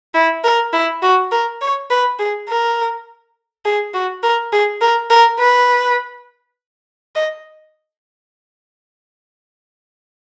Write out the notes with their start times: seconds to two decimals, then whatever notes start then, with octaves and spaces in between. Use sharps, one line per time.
0.14 E4
0.44 A#4
0.73 E4
1.02 F#4
1.32 A#4
1.61 C#5
1.90 B4
2.19 G#4
2.49 A#4
3.65 G#4
3.94 F#4
4.23 A#4
4.53 G#4
4.81 A#4
5.10 A#4
5.40 B4
7.16 D#5